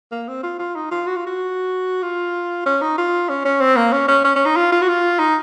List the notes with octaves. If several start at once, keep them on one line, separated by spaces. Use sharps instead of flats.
A#3
C4
F4
F4
D#4
F4
F#4
F4
F#4
F4
C#4
D#4
F4
C#4
C#4
C4
A#3
C#4
C#4
C#4
C#4
D#4
F4
F4
F#4
F4
D#4